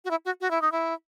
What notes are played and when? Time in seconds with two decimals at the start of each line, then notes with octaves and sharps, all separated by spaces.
0.05 F#4
0.11 E4
0.25 F#4
0.41 F#4
0.51 E4
0.62 D#4
0.72 E4